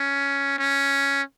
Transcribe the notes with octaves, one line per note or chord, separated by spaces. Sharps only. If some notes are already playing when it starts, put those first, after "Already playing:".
Already playing: C#4
C#4